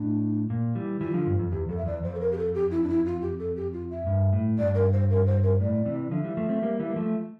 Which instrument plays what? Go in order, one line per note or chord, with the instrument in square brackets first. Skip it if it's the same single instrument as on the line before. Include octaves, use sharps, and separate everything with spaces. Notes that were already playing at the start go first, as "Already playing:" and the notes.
Already playing: [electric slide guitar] A2 [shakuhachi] D4
[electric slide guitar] A#2
E3 G3
[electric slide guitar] E3 G3 [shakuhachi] F4
[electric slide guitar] D3 F3
G2
F2
[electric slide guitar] E2 [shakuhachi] G4
[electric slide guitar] F2 [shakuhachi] A4
[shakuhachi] E5
[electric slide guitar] E2 [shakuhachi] D5
[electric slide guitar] F2 [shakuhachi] C5
[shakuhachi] A4
A#4
G4
A4
G4
E4
D4
E4
F4
G4
A4
G4
F4
E5
[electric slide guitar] G2
A2
[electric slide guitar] G2 [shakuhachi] D5
[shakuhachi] A#4
C5
A#4
C5
A#4
[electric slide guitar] A2 [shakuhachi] D5
[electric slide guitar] C3 E3
[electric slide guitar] D3 F3 [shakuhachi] E5
[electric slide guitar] E3 G3
F3 A3
A3 C4
G3 A#3
E3 G3
A#3
F3 A3